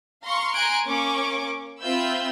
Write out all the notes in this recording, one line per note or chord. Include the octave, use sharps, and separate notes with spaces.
F5 A#5 C6 C#6
G#5 A#5 C6 F#6 G#6 D7
A#3 C#4 C#6 D6
C4 F4 E5 B5 E6 G6